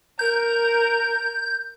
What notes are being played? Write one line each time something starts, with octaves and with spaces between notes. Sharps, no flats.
A#4 G6